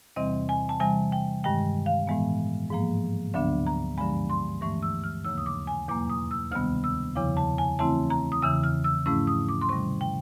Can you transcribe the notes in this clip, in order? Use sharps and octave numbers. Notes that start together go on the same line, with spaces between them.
E2 C3 E3 G3 C4 D#5
G#5
A5
C3 E3 G3 G#5
G5
G2 D#3 G#3 G5
F5
A2 E3 G#3 B3
G#2 F3 A#3
D2 D3 F#3 B3 D4 E5
A#5
G2 D3 F3 G#3 B5
C6
G2 E3 A3 C#6
E6
F6
D#2 C#3 F3 A#3 E6
D#6
D6
G#5
E2 B2 F#3 A#3 D6
D#6
E6
D2 C3 D#3 G3 B3 F6
E6
E2 C#3 F3 D6
A5
G#5
C#3 E3 A3 C4 E4 A5
A#5
D#6
E2 C#3 E3 E6
F6
E6
G#2 F3 A3 C#4 E4 E6
D#6
D6
C6
C3 D#3 G3 C#6
G5